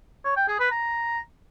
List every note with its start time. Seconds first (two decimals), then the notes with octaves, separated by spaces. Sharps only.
0.25 C#5
0.36 G5
0.48 G#4
0.59 B4
0.71 A#5